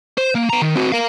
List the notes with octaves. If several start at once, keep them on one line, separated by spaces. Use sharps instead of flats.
C5
A#3
B3 A#5
D#3
C4 F#4
A#4 F5